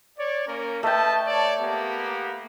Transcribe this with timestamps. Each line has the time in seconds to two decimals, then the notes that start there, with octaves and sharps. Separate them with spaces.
0.19 C#5 D5
0.48 A#3 C#4 A#4
0.83 A3 B4 D#5 G5 A5
1.27 C#5 D5 A5
1.61 A#3 B3 G4